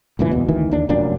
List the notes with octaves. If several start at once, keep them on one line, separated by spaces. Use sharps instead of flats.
C#2 G2 A#2 E3
E2 B2
D2 D#3 E3
D#2 D4
F1 F#2 A#2 D4